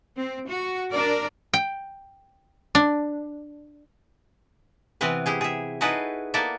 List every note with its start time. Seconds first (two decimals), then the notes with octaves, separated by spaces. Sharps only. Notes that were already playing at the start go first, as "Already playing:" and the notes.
0.17 C4
0.48 F#4
0.90 D4 A#4 D5
1.54 G5
2.75 D4
5.01 C3 E3 B3 C4 B4
5.26 E4 G4 G#4
5.41 G#4 E5
5.81 D#4 E4 F#4 G#4 A4 B4
6.34 A#3 B3 E4 A4 D5 E5